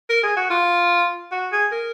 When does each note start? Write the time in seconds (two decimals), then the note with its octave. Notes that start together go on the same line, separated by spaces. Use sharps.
0.10 A#4
0.23 G#4
0.37 F#4
0.50 F4
1.32 F#4
1.52 G#4
1.72 A#4